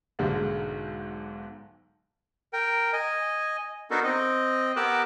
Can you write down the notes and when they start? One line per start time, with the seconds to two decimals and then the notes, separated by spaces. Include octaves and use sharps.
0.19 B1 G#2 D3 G#3 A#3
2.53 A#4 G5
2.93 D#5 G#5
3.91 B3 D4 D#4 F#4 A4 A#4
4.04 C4 D#5
4.76 B3 G4 A#4 D6 E6 F#6